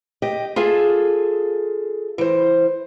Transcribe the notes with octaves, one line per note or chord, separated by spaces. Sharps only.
G4 D#5
F4 G#4 A4 E5
E3 C5